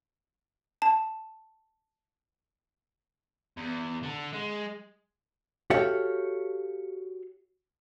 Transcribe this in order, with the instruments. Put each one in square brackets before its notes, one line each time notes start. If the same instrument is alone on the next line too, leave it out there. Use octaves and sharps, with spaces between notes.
[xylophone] A5
[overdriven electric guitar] E2
D3
G#3
[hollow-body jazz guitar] F#4 G4 A4 C#5 E5 F5